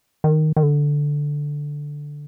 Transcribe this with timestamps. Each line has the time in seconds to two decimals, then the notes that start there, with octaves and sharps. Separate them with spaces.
0.24 D#3
0.56 D#3
0.63 D3